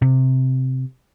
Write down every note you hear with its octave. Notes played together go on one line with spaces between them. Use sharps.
C3